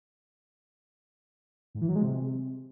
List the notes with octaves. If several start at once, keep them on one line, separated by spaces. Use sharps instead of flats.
G#2
E3
F#3
G#3
C3